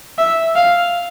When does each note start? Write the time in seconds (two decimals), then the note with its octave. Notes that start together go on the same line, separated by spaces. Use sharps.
0.19 E5
0.56 F5